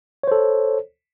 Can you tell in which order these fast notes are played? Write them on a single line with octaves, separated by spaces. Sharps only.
C#5 C5 A4